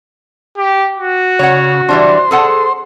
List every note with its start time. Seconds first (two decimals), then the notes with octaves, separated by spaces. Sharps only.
0.58 G4
0.99 F#4
1.39 C#3 C#5 F#5
1.89 E3 G3 D4 C5
2.31 G#4 A4 F#5